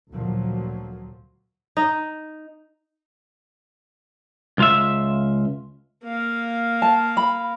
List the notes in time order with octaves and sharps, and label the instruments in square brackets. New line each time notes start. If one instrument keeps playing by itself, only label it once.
[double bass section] D2 A#2 F3 F#3
[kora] D#4
[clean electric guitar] C#2 F4 E5
[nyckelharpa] A#3 F5
[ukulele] A5
B5